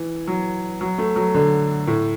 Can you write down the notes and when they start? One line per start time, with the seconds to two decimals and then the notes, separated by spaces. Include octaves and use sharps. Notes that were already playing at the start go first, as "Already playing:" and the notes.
Already playing: E3
0.27 F#3
0.81 F#3
0.98 A3
1.16 F#3
1.35 D3
1.87 A2